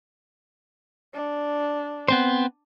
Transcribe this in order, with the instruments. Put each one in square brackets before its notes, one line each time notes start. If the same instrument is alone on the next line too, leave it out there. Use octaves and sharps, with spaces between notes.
[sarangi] D4
[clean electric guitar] B3 C4 C5